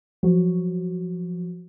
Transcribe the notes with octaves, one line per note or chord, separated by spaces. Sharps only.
F3 F#3 F#4